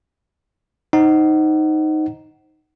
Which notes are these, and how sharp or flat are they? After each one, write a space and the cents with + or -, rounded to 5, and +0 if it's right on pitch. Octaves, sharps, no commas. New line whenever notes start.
D#4 +0 C5 +10 F#5 +25